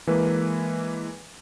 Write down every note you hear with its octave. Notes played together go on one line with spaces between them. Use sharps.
E3 G#3 A#3 B4